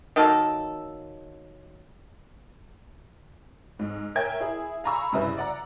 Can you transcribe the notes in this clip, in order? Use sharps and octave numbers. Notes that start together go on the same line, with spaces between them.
D#3 F#3 A#3 A4
G#2
A#4 C#5 E5 G5 G#5 G#6
E4 G#4
F5 G#5 A#5 B5 C#6 E6
G2 C#3 E4 B4 E5
D5 F#5 A#5